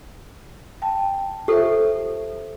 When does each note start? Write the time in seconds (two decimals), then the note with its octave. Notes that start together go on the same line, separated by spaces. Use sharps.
0.82 G5 A5
1.48 F4 G4 A4 C5 E5